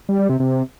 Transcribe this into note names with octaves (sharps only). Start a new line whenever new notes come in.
G3
G3
C3
C3